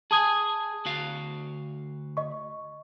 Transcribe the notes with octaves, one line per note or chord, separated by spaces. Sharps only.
G#4 G#5 A5 D#6 G#6
D2 F#4 F5
D#5 C#6